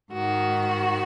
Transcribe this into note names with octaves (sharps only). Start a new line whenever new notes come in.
G#2 D#3 F#4